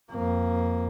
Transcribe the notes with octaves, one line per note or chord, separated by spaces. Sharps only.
F2 A#3